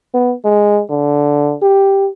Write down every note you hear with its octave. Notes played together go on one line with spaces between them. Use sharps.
B3
G#3
D3
G4